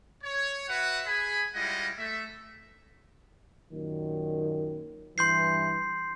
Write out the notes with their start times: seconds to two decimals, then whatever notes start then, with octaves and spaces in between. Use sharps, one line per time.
0.24 C#5
0.69 F#4 B4 E5 F#5
1.06 G#4 G#5 B5
1.55 G3 G#3 E4 F4 D#5 F#5
1.98 A3 E5
3.72 F#2 A#2 D#3
5.18 G2 E3 C6 G6 C7